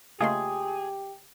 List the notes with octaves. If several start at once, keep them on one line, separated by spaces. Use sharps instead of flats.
C#3 A3 A#3 F4 G4 G#4 D#5 C6